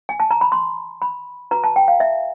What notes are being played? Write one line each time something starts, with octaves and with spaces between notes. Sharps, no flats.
G#5
A5
A#5
B5
C6
B5
F#4 B4 A#5
A5
G5
F5
E5